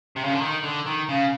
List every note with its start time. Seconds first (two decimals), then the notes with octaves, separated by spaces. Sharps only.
0.16 C3
0.24 C#3
0.32 D3
0.41 D#3
0.63 D3
0.86 D#3
1.09 C#3